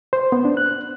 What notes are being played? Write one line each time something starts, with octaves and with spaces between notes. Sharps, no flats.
C5
B3
D4
F#6